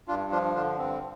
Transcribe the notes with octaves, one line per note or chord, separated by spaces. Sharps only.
G2 D4 F4
F3 D4 F4
D3 D4 F4
G2 C4